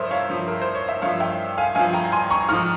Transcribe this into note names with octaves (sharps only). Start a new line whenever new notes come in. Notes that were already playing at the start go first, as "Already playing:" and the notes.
Already playing: G2 F3 A#4 C5 C#5 E5
C#5 F5
G2 F3
A#4
C5
C#5
E5
G2 F3 C#5 F5
E5 G5
F5 G#5
G2 F3 F5 G#5
G5 A#5
G#5 C6
A#5 C#6
G#2 F3 C#6 F6